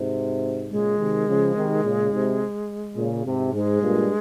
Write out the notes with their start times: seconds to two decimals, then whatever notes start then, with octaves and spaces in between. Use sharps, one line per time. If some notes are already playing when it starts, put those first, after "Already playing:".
Already playing: G#2 C3
0.70 A#2 C#3 G#3
0.99 C3 D#3
1.28 C#3 F3
1.56 C3 D#3
1.84 A#2 C#3
2.12 G#2 C3
2.97 A#2 C#3
3.25 G#2 C3
3.53 G#2 G#3
3.81 G2 A#2